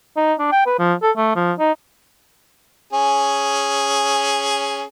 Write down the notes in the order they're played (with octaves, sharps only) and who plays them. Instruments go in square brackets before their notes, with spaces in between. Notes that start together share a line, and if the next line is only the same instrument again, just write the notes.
[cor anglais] D#4
D4
G5
B4
F3
A4
A3
F3
D#4
[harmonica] C#4 G#4